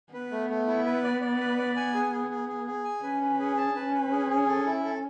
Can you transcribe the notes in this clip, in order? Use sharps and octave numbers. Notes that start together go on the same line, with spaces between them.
B3 B4
A3
A3
E4
B4
D5
D5
B4
D5
G#5
G#4
G#4
G#4
G#4
G#4
G#5
C#4 B4
B4
G#4
A5
C#4 B4
B4
G#4
G#4
A4
E4
A4